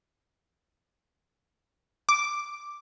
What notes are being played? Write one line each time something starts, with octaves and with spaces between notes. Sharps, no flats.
D6